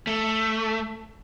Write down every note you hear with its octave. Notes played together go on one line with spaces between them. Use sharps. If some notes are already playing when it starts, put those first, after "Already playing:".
A3